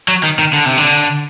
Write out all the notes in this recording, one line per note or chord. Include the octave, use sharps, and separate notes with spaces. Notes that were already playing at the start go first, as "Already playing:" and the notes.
F#3
D#3
D#3
D3
C3
D3